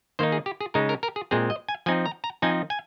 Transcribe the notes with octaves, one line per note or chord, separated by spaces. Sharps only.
D#3 A#3 D#4 C5
G#4
G4
G#4
C#3 G#3 D#4 A#4
A#4
A#4
G#4
A#2 G#3 C4 G#4
D#5
G#5
F3 C4 D#4 G#5
A#5
A#5
F3 C4 D#4 G#5
G#5